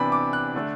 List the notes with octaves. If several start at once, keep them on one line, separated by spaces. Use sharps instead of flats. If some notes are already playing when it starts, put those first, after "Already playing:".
Already playing: C3 E3 B3 D4 B5
D6
F#6
D3 A3 D4